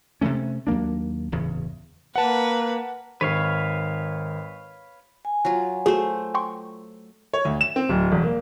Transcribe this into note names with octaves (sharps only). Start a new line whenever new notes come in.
C3 F3 A3 C#4
D#2 F#3 A#3 D4
D1 E2 C#3
A#3 B4 F#5 A5
G#1 B4 C#5 F5
G#5
F#3 F4
A3 F#4 G#4 C5
G5 C6 C#6
C#5
D2
E7
C4
D1
E1
A#3